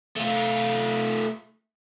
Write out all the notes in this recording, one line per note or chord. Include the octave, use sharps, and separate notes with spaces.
A3 F4